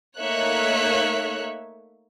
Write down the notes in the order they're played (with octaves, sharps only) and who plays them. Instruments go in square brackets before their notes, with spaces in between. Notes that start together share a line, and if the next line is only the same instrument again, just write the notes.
[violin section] A3 A#3 D#4 C#5 E5 F#6